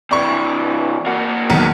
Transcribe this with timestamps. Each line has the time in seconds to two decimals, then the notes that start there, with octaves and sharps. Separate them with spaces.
0.11 C3 E3 D5 C#6
1.06 A#3 F#4
1.50 B1 E2 D#3